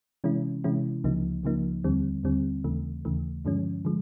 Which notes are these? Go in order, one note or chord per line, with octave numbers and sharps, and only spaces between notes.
C3 E3 G#3 C#4 E4
C3 E3 G#3 C#4 E4
C#2 C#3 F3 A#3 D#4
C#2 C#3 F3 A#3 D#4
D#2 D3 G3 C4
D#2 D3 G3 C4
D#2 C#3 E3 A3
D#2 C#3 E3 A3
G2 D3 F3 G#3 C#4
D3 F3 G#3